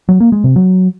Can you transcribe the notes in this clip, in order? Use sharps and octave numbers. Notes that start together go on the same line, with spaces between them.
F#3
A#3
G#3
C3
F#3